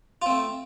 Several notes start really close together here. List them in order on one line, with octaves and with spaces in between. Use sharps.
F4 C4 A3